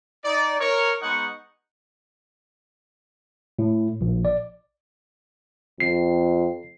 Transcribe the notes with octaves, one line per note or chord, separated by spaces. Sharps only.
D#4 D5
A#4 C#5
G#3 B3 D#4 F#5 C#6
A2
A#1
D5
F2 C7